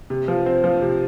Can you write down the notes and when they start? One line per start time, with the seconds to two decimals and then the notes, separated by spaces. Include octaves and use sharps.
0.10 C3
0.28 F3
0.46 C4
0.64 F3
0.82 C3